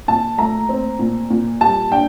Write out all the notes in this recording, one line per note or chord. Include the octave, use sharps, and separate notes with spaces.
A#2 A5
A3 A#5
C4
A#2
A#2
G3 A5
D4 G5